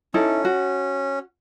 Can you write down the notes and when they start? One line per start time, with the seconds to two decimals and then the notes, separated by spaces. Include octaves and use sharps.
0.14 C#4 D#4 E4 A4
0.45 F#4